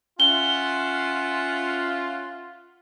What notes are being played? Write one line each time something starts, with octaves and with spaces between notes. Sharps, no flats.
C#4 F4 E5 F#5 G7